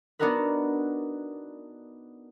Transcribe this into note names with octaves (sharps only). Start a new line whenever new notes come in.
B3 D4 D#4 F#4 A#4 B4